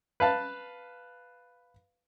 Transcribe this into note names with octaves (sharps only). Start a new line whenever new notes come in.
B4 F5 A5